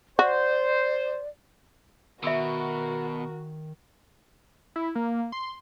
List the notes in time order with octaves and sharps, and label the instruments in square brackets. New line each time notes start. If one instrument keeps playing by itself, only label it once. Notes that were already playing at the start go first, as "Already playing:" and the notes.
[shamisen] F#4 [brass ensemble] C5 [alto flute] D5
[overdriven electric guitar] B2 [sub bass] D#3 [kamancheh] F#4 A#4 [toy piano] E5 B5 E6
[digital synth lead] E4
A#3
C6